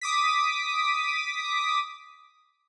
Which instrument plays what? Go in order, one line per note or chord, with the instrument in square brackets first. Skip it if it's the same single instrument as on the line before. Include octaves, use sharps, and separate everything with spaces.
[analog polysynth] D6 D#6 B6